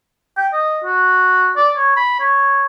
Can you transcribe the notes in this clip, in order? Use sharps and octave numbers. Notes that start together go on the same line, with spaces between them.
G5
D#5
F#4
D5
C#5
B5
C#5